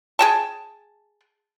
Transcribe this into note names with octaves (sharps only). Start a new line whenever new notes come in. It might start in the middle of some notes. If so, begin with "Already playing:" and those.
G#4 G5 A5